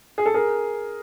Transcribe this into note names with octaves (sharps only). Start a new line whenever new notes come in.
G#4
A4
G#4 A#4